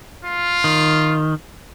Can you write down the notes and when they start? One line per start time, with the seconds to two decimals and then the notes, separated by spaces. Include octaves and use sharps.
0.25 F4
0.64 D#3